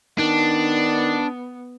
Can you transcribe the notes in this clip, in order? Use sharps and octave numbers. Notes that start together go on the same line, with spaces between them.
D#3 B3 D4